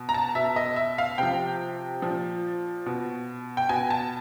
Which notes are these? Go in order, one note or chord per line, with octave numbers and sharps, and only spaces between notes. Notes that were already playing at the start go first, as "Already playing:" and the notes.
Already playing: B2
A#5
A5
B2 E5
D#5
E5
F5
C3 F3 G5
A#2 F3
B2
G5
B2 G#5
A5